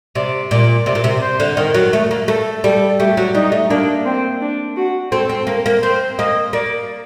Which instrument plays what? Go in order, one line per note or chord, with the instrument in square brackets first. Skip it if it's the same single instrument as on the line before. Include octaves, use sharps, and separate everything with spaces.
[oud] C3 [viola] D5
[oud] A#2 [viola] D5
[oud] C3 [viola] D5
[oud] A#2
C3
[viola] C5
[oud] D3
[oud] D#3 [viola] A#4
[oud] F#3
A3
A#3
[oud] A3 [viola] A4
[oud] G3 [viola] A4
[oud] A3 [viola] G4
[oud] F#3
[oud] G3 [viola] D#4
[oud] A3
[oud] A#3 [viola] D4
[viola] C4
D4
F#4
[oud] C4 [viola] A4
[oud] C4
[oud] A#3 [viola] A#4
[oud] A#3
[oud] C4 [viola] C5
[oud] A#3 [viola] D#5
[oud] A#3 [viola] D5